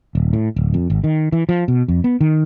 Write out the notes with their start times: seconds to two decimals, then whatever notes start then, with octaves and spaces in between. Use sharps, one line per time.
0.15 D#1
0.33 A2
0.56 D1
0.74 F2
0.90 G#1
1.04 D#3
1.32 E3
1.49 F3
1.68 B2
1.88 F2
2.04 B3
2.21 D#3